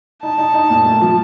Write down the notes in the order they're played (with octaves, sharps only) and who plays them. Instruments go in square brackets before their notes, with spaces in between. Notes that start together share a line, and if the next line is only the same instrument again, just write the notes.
[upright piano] D#4 [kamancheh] A5
[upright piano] D#4
D#4
A#2
A3
F3